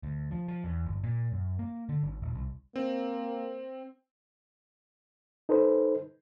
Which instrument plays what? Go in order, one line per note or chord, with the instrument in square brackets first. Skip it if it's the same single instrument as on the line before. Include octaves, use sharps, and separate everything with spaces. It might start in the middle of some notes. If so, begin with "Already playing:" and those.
[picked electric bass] D2
F3
F3
E2
G1
A#2
F#2
A#3
D3
G#1
D#1
C2
[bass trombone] A#3 [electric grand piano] C4
[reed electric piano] D#4 A4 B4 C5